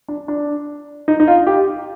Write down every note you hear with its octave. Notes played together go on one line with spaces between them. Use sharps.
D4
D4
D#4
D#4
F4
G4